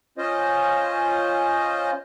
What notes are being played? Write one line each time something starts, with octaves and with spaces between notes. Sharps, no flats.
C#4 F4 C5 D#5